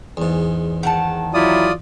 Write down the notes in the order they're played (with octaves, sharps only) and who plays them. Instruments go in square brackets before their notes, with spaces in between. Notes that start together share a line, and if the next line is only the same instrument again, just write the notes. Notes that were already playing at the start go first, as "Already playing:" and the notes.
[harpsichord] E2 G#2
[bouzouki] D#3 F#5 A5
[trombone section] F#3 E4 [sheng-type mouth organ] F4 D5 D#6